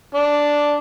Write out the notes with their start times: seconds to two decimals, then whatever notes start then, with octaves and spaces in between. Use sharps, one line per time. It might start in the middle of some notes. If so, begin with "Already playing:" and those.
0.14 D4